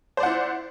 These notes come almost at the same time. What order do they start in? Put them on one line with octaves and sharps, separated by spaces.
C5 D5 F#5 E4